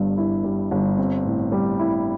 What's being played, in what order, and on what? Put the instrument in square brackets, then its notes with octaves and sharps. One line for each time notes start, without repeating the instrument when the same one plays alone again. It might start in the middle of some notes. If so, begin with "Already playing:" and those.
Already playing: [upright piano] G1 G2
E4
G3
G1
C4
A2
G3
E4